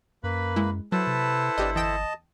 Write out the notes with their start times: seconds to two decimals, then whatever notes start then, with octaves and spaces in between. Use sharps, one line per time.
0.23 F#2 A#3 B4 B5
0.56 G#3 E4
0.92 F#3 E4 A4 B4 C5 A5
1.07 C3
1.58 G1 D4 G4 D#5
1.75 E2 D#5 G5 A5 E7